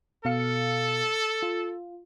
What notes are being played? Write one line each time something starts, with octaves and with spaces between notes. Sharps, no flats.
B2 A4 F5 C#7
F4